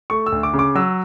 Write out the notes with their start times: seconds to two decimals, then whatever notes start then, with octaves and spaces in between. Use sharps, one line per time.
0.10 A3 C#6
0.26 E6
0.32 D2
0.43 D6
0.54 C#3
0.59 D6
0.75 F#3 E6